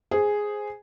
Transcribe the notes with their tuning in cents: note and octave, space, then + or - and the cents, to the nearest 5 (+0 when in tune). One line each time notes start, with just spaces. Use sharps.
G#4 +0 C5 +0